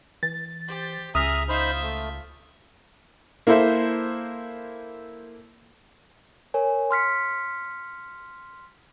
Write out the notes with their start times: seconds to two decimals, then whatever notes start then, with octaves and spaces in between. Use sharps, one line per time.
0.23 E3 A6
0.68 G4 C5
1.15 C#2 G#4 E5 A#5 D#6 F6
1.49 D#4 F4 C5 E5 B5
1.81 A3
3.47 A#3 E4 A4 C5 E5
6.54 A#4 C#5 G#5
6.91 C6 F6 B6 C#7